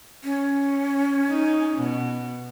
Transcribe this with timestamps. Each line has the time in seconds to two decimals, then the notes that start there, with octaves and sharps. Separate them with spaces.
0.24 C#4
1.28 D#4
1.77 B2